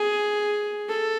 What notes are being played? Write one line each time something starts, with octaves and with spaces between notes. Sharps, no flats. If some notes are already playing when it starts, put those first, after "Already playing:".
Already playing: G#4
A4